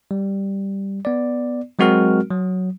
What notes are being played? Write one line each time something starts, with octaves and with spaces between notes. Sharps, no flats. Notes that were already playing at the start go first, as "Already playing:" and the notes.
G3
B3 D5
F#3 G#3 C4 F#4 A#4 F6
F#3